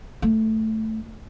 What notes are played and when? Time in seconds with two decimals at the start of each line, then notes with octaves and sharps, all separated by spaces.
0.22 A3